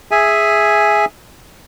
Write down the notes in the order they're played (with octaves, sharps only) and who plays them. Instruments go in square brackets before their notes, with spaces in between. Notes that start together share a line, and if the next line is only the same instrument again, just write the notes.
[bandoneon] G#4 E5 G#5